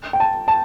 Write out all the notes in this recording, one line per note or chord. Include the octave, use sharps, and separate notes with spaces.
G5
A5
A5